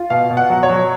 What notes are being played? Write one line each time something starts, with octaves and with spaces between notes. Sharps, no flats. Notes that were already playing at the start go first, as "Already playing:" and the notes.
Already playing: F4
B2 F5
B2
F#5
F#3
C#5
F#3